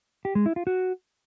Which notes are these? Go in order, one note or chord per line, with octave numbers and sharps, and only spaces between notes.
G4
G#3
E4
F4
F#4